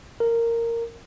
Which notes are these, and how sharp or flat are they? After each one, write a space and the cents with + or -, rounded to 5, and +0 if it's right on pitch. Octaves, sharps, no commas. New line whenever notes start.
A#4 -10